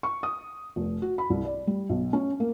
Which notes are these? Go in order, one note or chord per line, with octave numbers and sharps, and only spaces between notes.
C#6
D#6
F1
F#4
B5
C2
D5
G3
B1
C#4
A#3